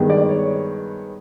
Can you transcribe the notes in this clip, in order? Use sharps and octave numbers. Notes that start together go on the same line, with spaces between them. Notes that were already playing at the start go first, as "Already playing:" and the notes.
Already playing: G2 D#3 G#3 B3
D5
C#5